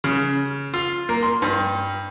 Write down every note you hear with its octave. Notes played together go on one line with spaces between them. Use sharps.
C#3
F4
A#3
C6
G2